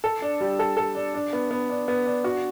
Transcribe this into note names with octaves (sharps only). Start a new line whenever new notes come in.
A4
D4
G3
A4
A4
D4
D4
B3
B3
D4
B3
D4
F#4